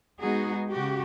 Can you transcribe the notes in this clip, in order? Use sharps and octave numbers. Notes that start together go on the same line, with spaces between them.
G#3 B3 D#4 F#4 G#4
C#3 F#4 G4